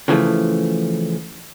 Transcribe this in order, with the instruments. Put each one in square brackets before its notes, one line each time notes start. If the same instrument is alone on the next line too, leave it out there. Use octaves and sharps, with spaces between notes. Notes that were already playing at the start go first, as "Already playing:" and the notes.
[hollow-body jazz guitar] C#3 E3 F3 A3